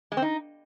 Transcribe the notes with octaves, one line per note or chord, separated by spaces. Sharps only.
G#3
C4
D#4